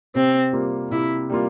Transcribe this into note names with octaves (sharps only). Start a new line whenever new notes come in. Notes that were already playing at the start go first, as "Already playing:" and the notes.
C3 C4
G3 A#3 F4
C3 E4
G3 A#3 F4